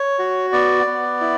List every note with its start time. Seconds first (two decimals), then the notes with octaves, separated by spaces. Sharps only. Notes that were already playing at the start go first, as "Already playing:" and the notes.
Already playing: C#5
0.19 F#4
0.53 B3 D5
0.87 B3
1.21 E4